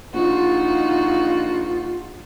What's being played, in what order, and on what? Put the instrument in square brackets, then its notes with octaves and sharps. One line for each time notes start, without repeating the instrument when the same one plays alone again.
[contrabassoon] A#1 [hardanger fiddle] D#4 F#4 [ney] F4